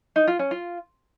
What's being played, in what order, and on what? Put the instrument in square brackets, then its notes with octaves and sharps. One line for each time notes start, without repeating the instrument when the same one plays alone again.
[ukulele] D#4
F4
C#4
F4